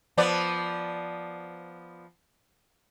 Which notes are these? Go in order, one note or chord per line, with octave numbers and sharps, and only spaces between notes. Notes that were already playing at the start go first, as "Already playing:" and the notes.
F3 B3 D5